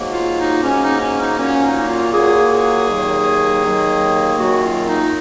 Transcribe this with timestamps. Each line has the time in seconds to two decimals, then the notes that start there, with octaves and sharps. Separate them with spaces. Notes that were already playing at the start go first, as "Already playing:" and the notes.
Already playing: G#2 F#3 A#3
0.13 F4
0.38 D#4
0.63 G#2 F#3 A#3 C#4
0.82 D#4
1.00 C#4
1.19 D#4
1.37 A#2 F#3 A#3 C#4
1.63 D#4
1.88 F4
2.13 A#2 F#3 A#3 G#4
2.51 G#4
2.88 D#2 D#3 F#3 A#3
3.63 D#2 D#3 F#3 A#3
4.38 F#2 D#3 F#3 A#3 F#4
4.63 F4
4.88 D#4